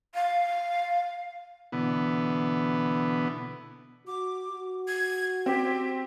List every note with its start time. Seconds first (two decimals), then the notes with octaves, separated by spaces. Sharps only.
0.15 F5
1.72 B2 D3 E3 B3
4.07 F#4 D6
4.49 F#4
4.88 G#6
5.46 C4 G4